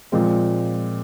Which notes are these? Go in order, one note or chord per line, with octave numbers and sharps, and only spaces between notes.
A#2 F3 G#3 C4